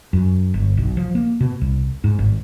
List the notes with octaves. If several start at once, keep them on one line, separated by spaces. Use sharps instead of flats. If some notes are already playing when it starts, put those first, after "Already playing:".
F#2
G1
B1
F3
A#3
B2
C2
G#2
G#1